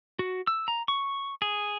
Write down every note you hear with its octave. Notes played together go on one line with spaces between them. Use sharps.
F#4
E6
A#5
C#6
G#4